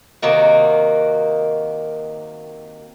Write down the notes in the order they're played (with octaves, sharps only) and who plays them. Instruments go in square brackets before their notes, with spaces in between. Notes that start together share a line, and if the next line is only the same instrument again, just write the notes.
[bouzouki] C3 D#3 A#3 F#4